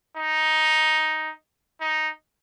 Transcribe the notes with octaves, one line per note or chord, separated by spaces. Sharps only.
D#4
D#4